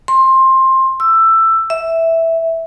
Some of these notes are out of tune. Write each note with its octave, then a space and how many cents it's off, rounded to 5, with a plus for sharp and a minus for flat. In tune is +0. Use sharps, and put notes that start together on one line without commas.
C6 +15
E6 +15
E5 -5